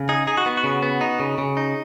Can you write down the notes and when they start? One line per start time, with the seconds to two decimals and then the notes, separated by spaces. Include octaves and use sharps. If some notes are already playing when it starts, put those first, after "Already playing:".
Already playing: C#3
0.09 D#4 G#4
0.27 D#4 G#4
0.37 F#4
0.46 B3
0.57 F#4
0.64 C#3
0.83 B3
1.01 D#4
1.20 C#3
1.38 C#3
1.57 D#4